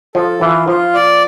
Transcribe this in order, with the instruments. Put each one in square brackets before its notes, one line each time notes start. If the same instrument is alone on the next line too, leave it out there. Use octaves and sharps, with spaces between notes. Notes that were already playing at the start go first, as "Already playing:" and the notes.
[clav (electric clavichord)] F3 [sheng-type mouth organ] A4
[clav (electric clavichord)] E3 [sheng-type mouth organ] F4
[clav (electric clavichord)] F3 [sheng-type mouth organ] F4
[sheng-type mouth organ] D5